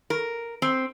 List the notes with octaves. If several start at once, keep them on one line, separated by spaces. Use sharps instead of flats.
A#4
C4